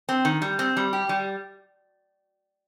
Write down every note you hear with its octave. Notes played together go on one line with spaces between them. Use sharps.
C4
D#3
G3
C4
G3
G4
G3